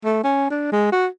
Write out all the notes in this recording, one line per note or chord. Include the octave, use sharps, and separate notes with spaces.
A3
C#4
D4
G#3
F#4